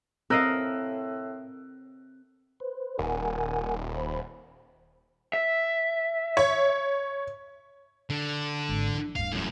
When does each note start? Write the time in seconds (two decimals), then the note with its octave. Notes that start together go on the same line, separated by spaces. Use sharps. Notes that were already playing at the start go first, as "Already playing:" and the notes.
0.30 A2 C4 A#4 D#5 F5 E6 F#6
2.60 B4 C5
2.99 D#1 A#4 F#5 G#5
3.95 C5 B5
5.33 E5
6.37 C#5
8.10 D3
8.69 G#1
8.94 E3
9.16 D1 G2 F5
9.32 F#2 A2